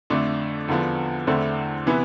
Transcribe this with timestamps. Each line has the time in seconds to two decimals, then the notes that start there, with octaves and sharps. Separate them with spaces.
0.10 F2 D3 A3 D4
0.68 E2 D3 F3 B3
1.27 E2 D3 A3 C4 E4
1.87 C3 E3 B3 E4